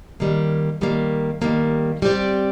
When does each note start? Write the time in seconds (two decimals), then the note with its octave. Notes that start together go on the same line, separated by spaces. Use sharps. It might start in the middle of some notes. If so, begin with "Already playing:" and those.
0.20 D#3 G3 A#3
0.81 D#3 G3 A#3
1.42 D#3 G3 A#3
2.02 G3 C4 G4 D5